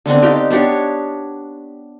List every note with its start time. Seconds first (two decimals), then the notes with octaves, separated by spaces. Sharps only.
0.06 D3 B3 C4 D4
0.22 D#4 G4 F5 G5
0.50 B3 D4 G4 C#5